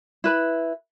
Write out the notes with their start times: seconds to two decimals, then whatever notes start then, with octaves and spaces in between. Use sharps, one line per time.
0.24 E4 B4 B5